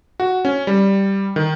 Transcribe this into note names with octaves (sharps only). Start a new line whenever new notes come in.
F#4
C#4
G3
D#3